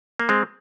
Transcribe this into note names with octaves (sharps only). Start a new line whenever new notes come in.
A#3
G#3 C4